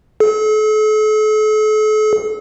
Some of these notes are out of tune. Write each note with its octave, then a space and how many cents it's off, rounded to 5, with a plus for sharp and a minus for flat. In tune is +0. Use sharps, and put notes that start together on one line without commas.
A4 -40